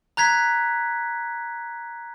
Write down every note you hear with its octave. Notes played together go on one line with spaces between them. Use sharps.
A#5 F#6 G#6 B6